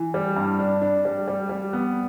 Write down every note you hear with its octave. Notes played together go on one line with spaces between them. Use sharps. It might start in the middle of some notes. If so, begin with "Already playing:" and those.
Already playing: E3
G3
G2
D4
D4
G3
G3
G3
B3